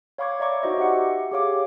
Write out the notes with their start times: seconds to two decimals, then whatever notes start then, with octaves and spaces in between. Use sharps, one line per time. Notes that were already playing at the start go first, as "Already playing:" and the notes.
0.18 C#5 F5 B5 C#6 D6 G#6
0.40 D5 E5 A#5 C#6 D6
0.63 D#4 F#4 C5 D#5
0.78 G4 E5 F#5 C#7
1.31 G4 G#4 C#5 F5 D6